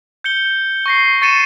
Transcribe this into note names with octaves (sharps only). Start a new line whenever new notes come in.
G6 C#7 G7
C#6 A#6 C7
C#6 A6 C#7 D#7 E7